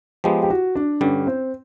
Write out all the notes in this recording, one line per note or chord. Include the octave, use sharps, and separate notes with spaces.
F3 G#3 B3 G4
G4
F#4
D4
G2 D3 G3 C#4
C4